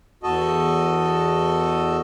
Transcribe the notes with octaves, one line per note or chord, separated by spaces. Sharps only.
E2 F#4 A4 D#5